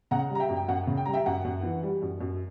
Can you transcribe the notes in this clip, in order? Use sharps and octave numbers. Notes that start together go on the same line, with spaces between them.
C#3 F#5 A#5
G3 A#5
E5 G5
F#2
G5
F#2 F#5
C#3
G5
G3 A#5
E5 G5
F#2 F#5
F#2
E3
G3
F#2
F#2